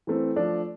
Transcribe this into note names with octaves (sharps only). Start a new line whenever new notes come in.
E3 A3 C4
F3 A3 D4